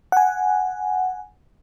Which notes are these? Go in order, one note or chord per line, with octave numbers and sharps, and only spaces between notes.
F#5 G#5